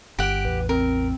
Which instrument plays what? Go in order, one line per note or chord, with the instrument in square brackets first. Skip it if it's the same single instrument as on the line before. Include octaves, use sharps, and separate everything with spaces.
[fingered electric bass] G1 [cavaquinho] G4 F#5 [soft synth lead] D7
[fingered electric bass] A1 E2 [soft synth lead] B4
[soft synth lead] C4 [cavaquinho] A#4